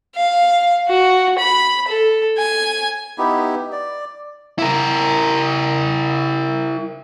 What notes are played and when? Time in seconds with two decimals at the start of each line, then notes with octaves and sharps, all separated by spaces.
0.16 F5
0.88 F#4
1.38 B5
1.88 A4
2.38 G#5
3.18 B3 D#4 E4 G4
3.72 D5
4.59 E4 A#4